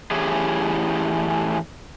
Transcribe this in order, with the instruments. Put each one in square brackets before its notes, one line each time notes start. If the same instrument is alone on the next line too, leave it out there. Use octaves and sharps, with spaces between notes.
[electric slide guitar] A2 E3 C#4 G4 G#4